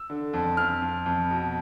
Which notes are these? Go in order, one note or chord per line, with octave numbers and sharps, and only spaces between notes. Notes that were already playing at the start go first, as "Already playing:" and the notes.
Already playing: E6
D3
F2
F2 F6
F2
F2
B2